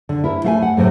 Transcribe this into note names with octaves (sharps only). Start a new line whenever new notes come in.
D3
E4 A#4
A3 F5 G#5
F#5
A2 C3 E3 F#3 A3